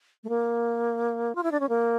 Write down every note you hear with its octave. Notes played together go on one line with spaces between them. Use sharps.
A3
A#3
F4
E4
D4
C#4
A#3